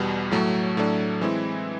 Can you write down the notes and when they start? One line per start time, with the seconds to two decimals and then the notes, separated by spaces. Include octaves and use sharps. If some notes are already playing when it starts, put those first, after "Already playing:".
Already playing: E2 B2 G3
0.31 A2 F#3 A3
0.77 A2 F#3 A3 D4
1.21 E3 G#3 C4 E4